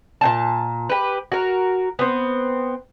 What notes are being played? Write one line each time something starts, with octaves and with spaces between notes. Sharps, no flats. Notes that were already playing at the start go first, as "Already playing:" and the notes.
A#2 C4 A5
G4 B4
F#4 A#4
B3 C4